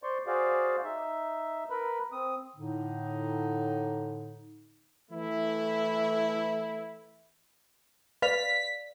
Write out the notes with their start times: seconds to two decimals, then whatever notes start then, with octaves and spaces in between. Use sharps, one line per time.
0.03 C5 D5 C6 C#6
0.27 F#4 G#4 C5 D5 F5
0.84 D#4 E5
1.70 A#4 B4 B5
2.12 C4 D#6
2.57 A2 D3 D#4
5.11 E3 A3 E4
8.22 B4 D5 F5 B6 F7